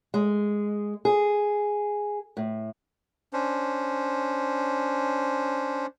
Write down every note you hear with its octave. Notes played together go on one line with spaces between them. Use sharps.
G#3
G#4
A2
C#4 D4 C5